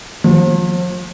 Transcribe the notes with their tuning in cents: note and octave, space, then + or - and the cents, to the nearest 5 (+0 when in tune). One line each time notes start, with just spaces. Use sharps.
F3 +40